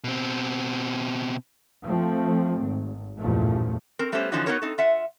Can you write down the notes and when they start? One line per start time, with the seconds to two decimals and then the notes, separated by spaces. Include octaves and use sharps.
0.04 B2 C4
1.84 F3 A3 C4
2.62 G#1
3.18 A1 E2 G2 A#2 F3 A3
3.99 C4 A#4
4.12 G3 A3 B3 C#4 G4 C5
4.32 D3 E3 F3 C#4 D#4 F#4
4.46 B3 C4 D#4 F#4 A#4 C#5
4.62 C4 D#4 A4
4.78 F4 E5 F#5